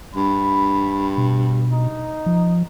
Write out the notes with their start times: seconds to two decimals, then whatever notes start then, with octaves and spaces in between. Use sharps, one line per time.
0.16 G2 B5
1.18 B2
1.72 D#4
2.26 F3